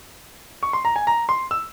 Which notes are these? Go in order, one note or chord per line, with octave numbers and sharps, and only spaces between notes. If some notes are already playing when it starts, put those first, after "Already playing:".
C#6
C6
A#5
G#5
A#5
C6
E6